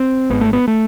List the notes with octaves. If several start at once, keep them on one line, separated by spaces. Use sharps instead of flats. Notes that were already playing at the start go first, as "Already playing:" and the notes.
Already playing: C4
G#1 G#2 B3
A3
B3
A3